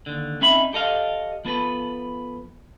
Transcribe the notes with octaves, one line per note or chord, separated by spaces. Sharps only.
D#2 D3
C4 C#4 D#4 E5 B5
G4 A4 D#5 F5
F3 B3 A4 B4